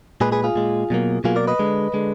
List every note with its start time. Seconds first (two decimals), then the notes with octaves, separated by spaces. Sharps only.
0.21 A#2 G#3 G#4 B4
0.32 G#4 B4
0.44 F4 G#4
0.56 A#2 G#3
0.90 B2 F#3 A#3
1.24 B2 F#3 A#3 F4 G#4
1.36 A#4 D5
1.47 B4 D#5
1.59 D3 G#3
1.94 D3 G#3